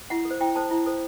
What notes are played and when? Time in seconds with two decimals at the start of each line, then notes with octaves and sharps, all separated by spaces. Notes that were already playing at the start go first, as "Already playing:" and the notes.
0.10 E4 F#5
0.25 A4
0.31 C5
0.40 E4 G5
0.56 A4 C5 A5
0.71 E4
0.86 A4 C5